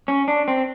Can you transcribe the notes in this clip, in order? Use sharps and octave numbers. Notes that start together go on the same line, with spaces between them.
C#4
D4
C4